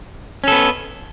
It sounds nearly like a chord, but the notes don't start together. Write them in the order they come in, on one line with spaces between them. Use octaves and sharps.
C#4 A4 B3